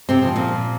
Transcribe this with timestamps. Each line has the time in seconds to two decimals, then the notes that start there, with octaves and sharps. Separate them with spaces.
0.09 C3 C4
0.22 C#3 F3
0.36 A#2 A#3